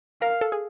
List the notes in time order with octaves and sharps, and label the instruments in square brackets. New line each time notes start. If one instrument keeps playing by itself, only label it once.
[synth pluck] A#4 [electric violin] F5
[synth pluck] A4
G#4